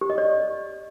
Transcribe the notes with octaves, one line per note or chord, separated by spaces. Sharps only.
G4
D#5
D5